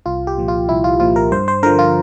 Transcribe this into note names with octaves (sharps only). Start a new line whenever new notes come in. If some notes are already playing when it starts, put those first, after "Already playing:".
C2 F4
G4
A#2 F3
F4
C2 E4
F4
A#2 F3 F4
A#4
G2 C5
C5
D3 F3 A#4
F4